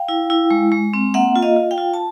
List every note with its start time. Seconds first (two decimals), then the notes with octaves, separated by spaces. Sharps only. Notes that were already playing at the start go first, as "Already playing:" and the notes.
Already playing: F5 G5
0.09 E4
0.30 E4
0.51 G#3
0.72 G#3
0.94 C4
1.14 A#3 E5 F#5
1.36 F4
1.42 D#5 F5
1.57 F4
1.71 F5 G5
1.78 F4
1.94 A5